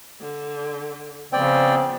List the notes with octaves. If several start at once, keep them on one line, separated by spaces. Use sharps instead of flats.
D3
C#3 F3 B3 C4 D5 G5